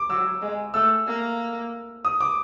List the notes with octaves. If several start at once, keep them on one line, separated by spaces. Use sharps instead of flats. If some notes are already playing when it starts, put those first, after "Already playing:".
Already playing: D6
F#3 E6
G#3
A3 E6
A#3
D#6
D6